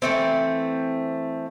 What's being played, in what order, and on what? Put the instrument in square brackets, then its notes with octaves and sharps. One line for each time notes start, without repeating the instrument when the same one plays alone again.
[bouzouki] E3 A3 C4